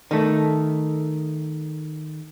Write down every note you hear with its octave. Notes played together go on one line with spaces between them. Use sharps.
D#3 A3